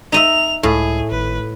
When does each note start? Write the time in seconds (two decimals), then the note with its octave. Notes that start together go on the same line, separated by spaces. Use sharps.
0.12 D#4 D#5 E5 F7
0.63 C#2 A2 G#4
1.11 G#1 B4